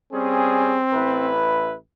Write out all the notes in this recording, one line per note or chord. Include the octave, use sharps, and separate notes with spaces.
G3 C4 C#4 G#4
A1 E4 B4